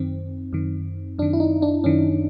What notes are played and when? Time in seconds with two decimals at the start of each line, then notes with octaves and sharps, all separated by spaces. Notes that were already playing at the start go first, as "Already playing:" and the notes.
Already playing: F#2 D#3 C4
0.53 F#2 D#3
1.18 F#2 D#3 D4
1.33 E4
1.40 D#4
1.62 D4
1.84 F#2 D#3 C#4